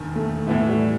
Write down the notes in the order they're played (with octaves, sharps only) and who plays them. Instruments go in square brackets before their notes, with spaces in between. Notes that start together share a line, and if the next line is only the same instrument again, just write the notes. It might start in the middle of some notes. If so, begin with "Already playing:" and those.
Already playing: [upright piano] E1 D#2 D#3
[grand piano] A3
[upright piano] A2 E3 B3 E4 [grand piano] A3
[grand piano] G3